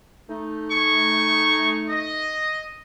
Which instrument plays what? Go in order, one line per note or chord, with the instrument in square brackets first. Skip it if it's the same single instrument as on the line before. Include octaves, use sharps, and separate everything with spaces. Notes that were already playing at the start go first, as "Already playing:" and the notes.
[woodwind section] A3 D#4
[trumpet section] G#4 C#6
D#5